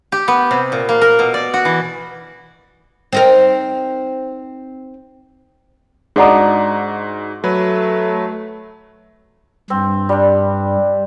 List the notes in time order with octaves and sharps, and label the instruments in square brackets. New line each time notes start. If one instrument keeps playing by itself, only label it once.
[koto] G4
B3
C3
A#2
A#3
A#4
B2
D5
F#4
E3
[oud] C4 D#4 A#4
[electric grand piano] G#2 F#4 [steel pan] D4 D5 D#5 [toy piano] G#4 F#5 A#5
[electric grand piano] F#3 B4 [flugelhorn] A3
[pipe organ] G2 [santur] C4
[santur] G3 D4